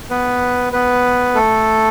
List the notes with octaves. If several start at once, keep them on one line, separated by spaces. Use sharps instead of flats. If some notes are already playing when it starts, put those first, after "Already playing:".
B3 B4
B3 B4
A3 A4